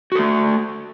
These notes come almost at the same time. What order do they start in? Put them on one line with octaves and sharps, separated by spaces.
F#4 A4 A3